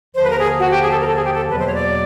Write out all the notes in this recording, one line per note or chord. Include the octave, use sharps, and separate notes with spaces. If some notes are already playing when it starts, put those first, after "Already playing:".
D#2 D3 F3 C5
B4
A#4
G#4
F#4
G4
G#4
A4
A#4
A4
G#4
G4
A4
E2 B2 F#3 A#3 B4
C5
C#5
D5